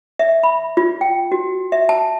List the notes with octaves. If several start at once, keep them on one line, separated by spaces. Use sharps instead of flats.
E5
B5
F4
G5
F#4
E5
A5